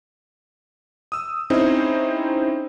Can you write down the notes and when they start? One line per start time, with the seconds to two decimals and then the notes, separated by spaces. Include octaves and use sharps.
1.12 D#6 E6
1.50 C4 C#4 D#4 E4 G#4 C5